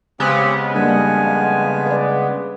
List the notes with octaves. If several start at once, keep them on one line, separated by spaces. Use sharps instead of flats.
C#3 G#3 B3 C4 G4
F2 G3 A#3 D4 G#5
B4 D5